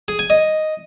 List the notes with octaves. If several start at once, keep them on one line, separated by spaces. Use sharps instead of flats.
G#4
G#5
D#5